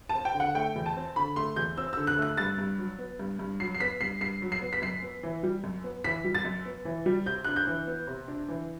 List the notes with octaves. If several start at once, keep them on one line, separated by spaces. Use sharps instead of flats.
C4 A5
G5
D3
F#5
A3 G5
E2
A5
C4
D3 B5
A3 C6
E2 G6
C4 E6
D3 E6
F#6
A3
F#6
G2 A6
G2
F#3
B3
G2
G2
F#3 C7
C7
B3 B6
G2 C7
G2 C7
F#3
C7
B3
B6
F#2 C7
B3
E3
G3
F#2
B3
E3 B6
G3
A6
F#2
B3
E3
G3
C3 G6
D4 F#6
G6
E3
B3
C3
D4
E3